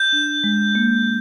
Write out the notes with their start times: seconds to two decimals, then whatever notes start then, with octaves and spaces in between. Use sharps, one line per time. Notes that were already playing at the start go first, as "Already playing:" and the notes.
Already playing: G6
0.13 D4
0.44 G#3
0.75 A#3